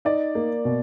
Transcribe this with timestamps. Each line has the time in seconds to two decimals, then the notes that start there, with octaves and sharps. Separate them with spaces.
0.05 D#4 D5
0.35 A#3
0.65 B2